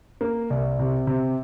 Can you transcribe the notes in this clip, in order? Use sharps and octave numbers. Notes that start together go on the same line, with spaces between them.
A#3
C2
C3
C3